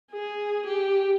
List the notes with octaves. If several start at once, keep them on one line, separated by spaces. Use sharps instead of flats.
G#4
G4